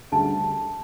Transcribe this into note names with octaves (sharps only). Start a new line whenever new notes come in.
D2 C#3 G3 D4 A5